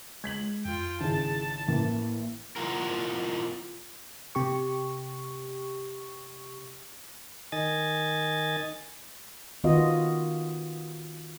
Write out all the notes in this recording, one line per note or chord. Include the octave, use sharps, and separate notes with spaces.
G#3 G#6 B6 F#7
F2 F4 G5
G#1 C#3 E4 G#4 A5
A1 A#3 E4
B2 E3 F4 F#4 A#4
C3 G4 C#6
D#3 D#5 G#5 A6
D#3 B3 F4 F#4 D#5